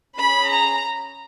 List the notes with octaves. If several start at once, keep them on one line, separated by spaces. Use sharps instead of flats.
C#4 G#4 B5
A#5